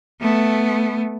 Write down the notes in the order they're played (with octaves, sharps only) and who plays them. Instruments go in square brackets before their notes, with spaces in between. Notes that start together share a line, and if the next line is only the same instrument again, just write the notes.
[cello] A3 B3